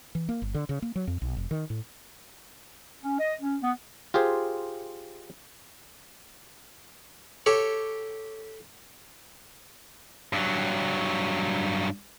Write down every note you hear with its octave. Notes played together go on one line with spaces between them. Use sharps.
E3
A#3
G1
D3
C#3
A#3
F#3
F2
B1
F1
D#3
A2
C#4
D#5
C#4
B3
F4 G4 G#4 C5
G4 A4 C#5
G2 F#3